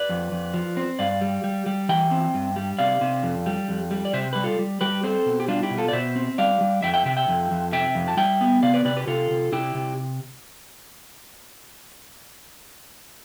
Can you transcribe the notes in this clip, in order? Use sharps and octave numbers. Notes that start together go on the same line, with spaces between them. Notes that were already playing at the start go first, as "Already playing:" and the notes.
Already playing: B4 D5
F2
F2
F3
C4
G2 D5 F5
G3
G3
G3
E3 E5 G5
C4
G2
G3
C3 D5 F5
C3
F2
G3
F2
G3
D5
C3 C5 E5
G3 B4
F4 A4
G3
G3 G4 B4
C4 A4 C5
B2
G4
G3 D4 F4
E4 G4
B2
F4 A4
D5
B2 C5 E5
C4
G3 D5 F5
G3
F2 E5 G5
E5 G5
C3 E5 G5
E5 G5
F2
F2
C3 E5 G5
F2
A5
G3 E5 G5
B3
C3 D5 F5
B4 D5
C3 B4 D5
G4 B4
C3 F4 A4
C3
C3 E4 G4
C3